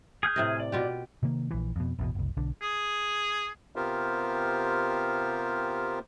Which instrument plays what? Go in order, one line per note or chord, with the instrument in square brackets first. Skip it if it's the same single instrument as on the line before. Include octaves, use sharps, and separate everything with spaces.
[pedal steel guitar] G#4 F6 G6
[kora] A2 C3 D#5
[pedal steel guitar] D5
[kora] B2 F4 G4
[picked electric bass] C3 D#3 A#3
A#1 E3
F2 B2
A1 E2 B2
F#1 C2
B1 D3
[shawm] G#4
[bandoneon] C3 B3 F4 G4 A#4 C5